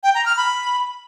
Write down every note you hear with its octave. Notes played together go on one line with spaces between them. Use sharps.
G5
A#5
F6
B5